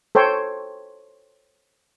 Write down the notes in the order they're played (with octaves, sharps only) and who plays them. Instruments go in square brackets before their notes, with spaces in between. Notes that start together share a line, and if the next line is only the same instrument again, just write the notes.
[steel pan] A4 C5 C#5 G5